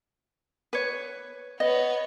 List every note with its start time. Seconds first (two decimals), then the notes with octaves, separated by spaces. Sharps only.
0.73 B4 C#5
1.60 B3 C#5 D#5